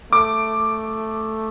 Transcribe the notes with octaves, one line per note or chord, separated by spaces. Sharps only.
A3 D6